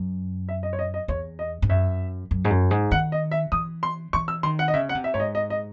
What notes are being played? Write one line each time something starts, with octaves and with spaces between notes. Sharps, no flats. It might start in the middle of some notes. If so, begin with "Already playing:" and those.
Already playing: F#2
E5
D#5
C#5
D#5
D#5
E2 C#5
D#5
G#2
F#2 E5
F#2
G#2
F#2
G#2
D#3 F#5
D#5
E5
E3 D#6
C6
E3 C#6
E6
D#3 C6
F#5
D#5
C#3 E5
F#5
C3
E5
G#2 C#5
D#5
D#5
D#5